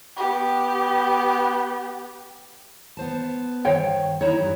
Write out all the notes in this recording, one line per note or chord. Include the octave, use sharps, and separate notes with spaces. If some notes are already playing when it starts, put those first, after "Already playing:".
B3 G4
B3 C5 A5
G2 D#3 C5 C#5 G5
D#4 E4 C#5 A#5
G2 G3